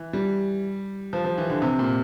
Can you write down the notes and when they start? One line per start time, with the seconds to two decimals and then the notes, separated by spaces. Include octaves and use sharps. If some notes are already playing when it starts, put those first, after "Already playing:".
Already playing: E3
0.13 G3
1.13 F3
1.25 F3
1.38 E3
1.49 D3
1.62 C3
1.79 A#2